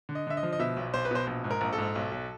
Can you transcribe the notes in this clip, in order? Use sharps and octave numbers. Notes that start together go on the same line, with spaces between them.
D3
D#5
D3 E5
D#5
F3
D#5
B2 E5
B1
B1 C5
B4
B2 C5
A#1
G#2
A#4
A#1
A4
G#2
B1
B1